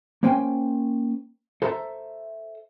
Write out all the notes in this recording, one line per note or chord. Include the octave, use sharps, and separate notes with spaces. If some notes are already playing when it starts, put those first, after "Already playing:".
A#3 C#4 C5 G5 G#5
A4 C5 E5 A#5